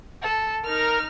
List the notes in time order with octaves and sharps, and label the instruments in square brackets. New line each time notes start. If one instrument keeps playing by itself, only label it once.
[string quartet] A4
[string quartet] D#4 F6 [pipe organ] A#4